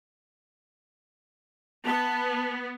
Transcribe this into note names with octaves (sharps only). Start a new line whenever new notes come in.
B3 A5